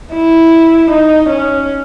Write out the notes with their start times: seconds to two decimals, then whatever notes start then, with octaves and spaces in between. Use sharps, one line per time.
0.13 E4
0.91 D#4
1.29 C#4